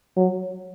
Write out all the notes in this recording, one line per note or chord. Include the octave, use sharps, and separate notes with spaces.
F#3